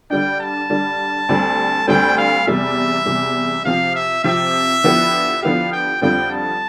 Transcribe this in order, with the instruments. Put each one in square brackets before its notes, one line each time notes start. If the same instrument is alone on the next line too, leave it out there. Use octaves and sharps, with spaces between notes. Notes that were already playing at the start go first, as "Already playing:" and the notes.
[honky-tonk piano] D3 G3 D4 [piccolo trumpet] G5
[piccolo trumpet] A5
[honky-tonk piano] D3 G3 D4
D2 D3 G3 C4
[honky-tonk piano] D2 D3 G3 C4 [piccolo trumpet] G5
[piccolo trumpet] F5
[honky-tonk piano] E2 C3 G3 [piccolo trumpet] E5
[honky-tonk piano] E2 C3 G3
[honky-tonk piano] C3 F3 C4 [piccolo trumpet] F5
[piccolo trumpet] E5
[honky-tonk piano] C3 F3 C4 [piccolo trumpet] E5
[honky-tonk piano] D3 F3 B3 E4 G4
[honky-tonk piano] D3 F3 B3 E4 G4 [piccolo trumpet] F5
[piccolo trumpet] G5
[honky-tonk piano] F2 D3 G3 C4 F4 [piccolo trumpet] G5
[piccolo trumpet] A5